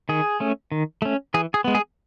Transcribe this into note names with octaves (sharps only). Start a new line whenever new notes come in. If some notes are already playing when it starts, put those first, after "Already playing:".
D#3 G#4
A3 C#4
D#3
A3 C#4
E3 G#4
G#4
G#3 B3
G#4